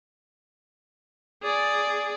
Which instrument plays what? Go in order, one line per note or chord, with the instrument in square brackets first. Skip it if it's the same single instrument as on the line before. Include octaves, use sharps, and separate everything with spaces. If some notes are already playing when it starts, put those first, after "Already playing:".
[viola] G#4 D5